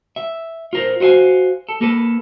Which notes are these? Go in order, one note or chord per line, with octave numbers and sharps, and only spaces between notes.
E5
F4 A#4 C5
F#4 C5 D#5 F5 G#5
A4
A#3 A4 B4